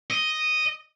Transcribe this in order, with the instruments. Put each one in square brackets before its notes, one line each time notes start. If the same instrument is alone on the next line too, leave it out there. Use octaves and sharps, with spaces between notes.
[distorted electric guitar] D#5